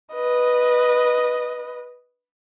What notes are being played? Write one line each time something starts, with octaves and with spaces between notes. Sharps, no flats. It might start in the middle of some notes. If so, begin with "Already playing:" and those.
B4 D#5